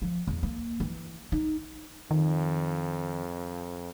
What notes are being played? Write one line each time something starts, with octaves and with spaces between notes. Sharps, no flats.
F3
E2
A#3
E3
D#4
F2 D#3